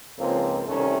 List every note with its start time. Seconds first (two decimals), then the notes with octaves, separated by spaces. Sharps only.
0.19 C#2 G#2 F3 A#3 C4
0.67 C2 C3 D#3 A3 C#4